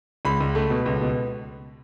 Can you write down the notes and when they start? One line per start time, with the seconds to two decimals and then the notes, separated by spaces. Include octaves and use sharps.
0.25 C#2 B5
0.40 C#2
0.55 A3
0.70 B2
0.86 C#2
1.01 B2